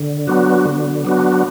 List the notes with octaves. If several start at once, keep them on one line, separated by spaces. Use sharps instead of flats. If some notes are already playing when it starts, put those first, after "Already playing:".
Already playing: D3
F#3 B3 D4 F#4
D3
F#3 B3 D4 F#4